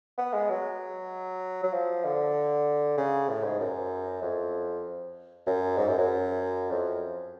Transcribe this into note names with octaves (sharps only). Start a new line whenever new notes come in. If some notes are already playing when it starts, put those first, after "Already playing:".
B3
G#3
F#3
F#3
F3
D3
C#3
A2
G#2
F#2
F2
F#2
G#2
F#2
F#2
F2